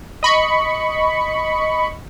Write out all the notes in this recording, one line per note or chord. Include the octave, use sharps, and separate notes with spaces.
D#5 B5 C#6 C#7